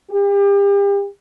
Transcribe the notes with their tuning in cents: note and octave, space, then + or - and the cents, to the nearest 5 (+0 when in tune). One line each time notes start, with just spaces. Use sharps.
G4 +35